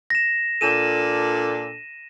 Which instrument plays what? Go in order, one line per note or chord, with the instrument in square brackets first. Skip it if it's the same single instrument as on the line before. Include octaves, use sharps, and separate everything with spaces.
[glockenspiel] A#6 E7
[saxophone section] A#2 D4 A4 [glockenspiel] D#7 E7